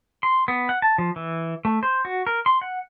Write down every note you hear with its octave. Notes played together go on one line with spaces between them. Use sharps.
C6
B3
F#5
A5
F3
E3
A3
C5
F#4
A#4
C6
F#5